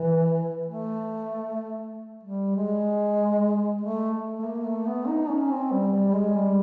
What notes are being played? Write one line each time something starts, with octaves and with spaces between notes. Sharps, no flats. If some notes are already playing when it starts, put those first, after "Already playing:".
Already playing: E3
A3
G3
G#3
A3
A3
A#3
A3
B3
D#4
C#4
C4
G3
G3
G3
G#3
G3